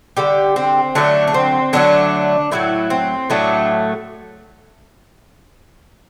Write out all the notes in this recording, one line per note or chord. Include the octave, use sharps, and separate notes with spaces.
D3 G3 G4
C4
D3 F#3 A3 D4
D4
C4
D3 F#3 A3 D4
A2 F#3 A3 E4
C4
A2 F#3 A3 D4